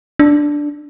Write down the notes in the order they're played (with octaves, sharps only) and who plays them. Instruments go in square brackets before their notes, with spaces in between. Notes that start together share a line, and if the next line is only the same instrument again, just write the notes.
[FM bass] D4